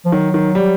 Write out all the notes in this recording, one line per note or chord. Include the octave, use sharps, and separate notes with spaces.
F3
D#3 F#3
D#3
G3